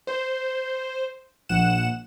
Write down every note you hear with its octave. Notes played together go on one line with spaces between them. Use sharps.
C5
A#1 F#5 E7